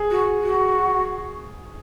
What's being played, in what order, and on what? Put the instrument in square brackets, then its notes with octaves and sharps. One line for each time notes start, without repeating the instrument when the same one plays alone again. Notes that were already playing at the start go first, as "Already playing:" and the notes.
Already playing: [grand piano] G#4
[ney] F#4
F#4